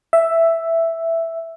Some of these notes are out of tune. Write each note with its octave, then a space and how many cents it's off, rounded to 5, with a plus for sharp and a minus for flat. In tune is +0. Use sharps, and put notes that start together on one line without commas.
E5 +5